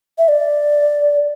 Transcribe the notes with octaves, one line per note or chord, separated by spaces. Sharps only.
E5
D5